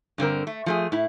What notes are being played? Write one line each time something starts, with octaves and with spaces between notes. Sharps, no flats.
G2 D3 C4 A#4
A3
F3 A3 G#4
A2 E4